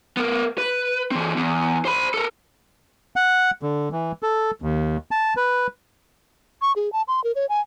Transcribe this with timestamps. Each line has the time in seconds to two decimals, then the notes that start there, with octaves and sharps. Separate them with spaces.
0.17 B3 A#4
0.58 B4
1.11 E3 C4
1.37 E2
1.85 C5 B5
2.14 A4 A#4
3.16 F#5
3.62 D3
3.92 E3
4.23 A4
4.62 D#2
5.11 A5
5.37 B4
6.61 C#6
6.76 G#4
6.92 A5
7.08 C6
7.24 A#4
7.35 C#5
7.49 G#5